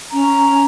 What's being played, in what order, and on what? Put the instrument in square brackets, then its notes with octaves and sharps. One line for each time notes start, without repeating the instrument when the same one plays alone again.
[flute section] C#4 A#5